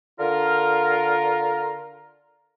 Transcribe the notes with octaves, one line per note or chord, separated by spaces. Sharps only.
D3 F4 A#4